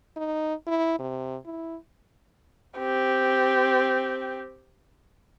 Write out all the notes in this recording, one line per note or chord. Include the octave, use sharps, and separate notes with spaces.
D#4
E4
C3
E4
C4 G4